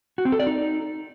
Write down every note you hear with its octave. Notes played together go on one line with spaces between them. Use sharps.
F#4
C4
A4
D5
D#4